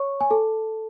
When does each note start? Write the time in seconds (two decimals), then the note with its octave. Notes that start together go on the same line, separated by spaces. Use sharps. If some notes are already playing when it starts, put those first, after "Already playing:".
Already playing: C#5 C#6
0.21 G#5
0.30 A4 A5